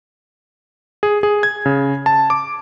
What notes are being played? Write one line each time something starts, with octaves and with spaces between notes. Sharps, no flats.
G#4
G#4
G#6
C#3
A5
D6